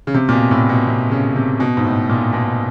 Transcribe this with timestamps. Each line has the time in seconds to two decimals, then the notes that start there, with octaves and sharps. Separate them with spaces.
0.07 C#3
0.14 C3
0.29 A#2
0.33 B2
0.51 A2
0.69 B2
0.87 C3
1.11 C#3
1.36 C3
1.60 B2
1.77 G#2
1.85 A2
2.09 A#2
2.33 B2